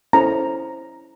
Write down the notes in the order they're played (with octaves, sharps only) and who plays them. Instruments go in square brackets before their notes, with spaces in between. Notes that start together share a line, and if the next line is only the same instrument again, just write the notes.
[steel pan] C#4 E4 A4 C5 A#5